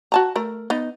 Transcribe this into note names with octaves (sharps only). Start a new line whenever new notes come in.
F#4 A5 A#5
A3 A#4
B3 D#4